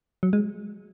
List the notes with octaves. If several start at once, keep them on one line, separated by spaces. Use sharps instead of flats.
F#3
G#3